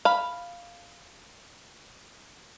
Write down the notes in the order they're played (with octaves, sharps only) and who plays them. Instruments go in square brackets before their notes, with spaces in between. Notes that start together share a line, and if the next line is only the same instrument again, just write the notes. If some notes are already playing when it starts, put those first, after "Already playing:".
[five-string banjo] F5 B5